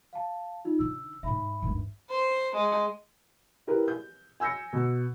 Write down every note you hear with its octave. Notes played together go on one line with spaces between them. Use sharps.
F5 A5
D#4 F4
D3 D#4 E6
G#2 D#4 E5 B5
G1 D#2
C5
G#3
E4 G4 A#4 B4
G6
G#5 E6 G6 A#6 C#7
B2